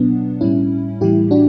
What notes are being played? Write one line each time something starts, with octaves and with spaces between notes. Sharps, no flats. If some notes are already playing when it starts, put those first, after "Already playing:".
Already playing: B2 F#3 B3 D4
A2 G3 C#4 E4
A2 E3 G3 E4 G4
D4 F#4